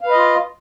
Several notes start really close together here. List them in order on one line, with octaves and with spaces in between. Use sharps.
F5 B4 D#5 F4